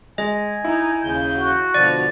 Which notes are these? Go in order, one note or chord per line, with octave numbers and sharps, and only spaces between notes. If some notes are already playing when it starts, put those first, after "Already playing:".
G#3 D#5 G#5
D#4 E4
D#2 C#3 G6
F#4
B2 D3 F3 D5